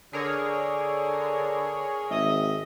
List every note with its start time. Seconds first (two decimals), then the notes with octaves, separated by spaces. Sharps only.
0.13 D3 G#4 A#4 C#5
2.10 G#1 D#5 E5